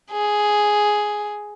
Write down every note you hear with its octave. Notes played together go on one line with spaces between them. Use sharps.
G#4